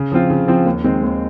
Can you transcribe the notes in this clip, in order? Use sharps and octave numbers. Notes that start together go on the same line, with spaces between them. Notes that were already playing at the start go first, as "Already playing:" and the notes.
Already playing: C#3
F3 C4 F4
C#3
F3 C4 F4
D#2
D#3 G#3 C4
D#2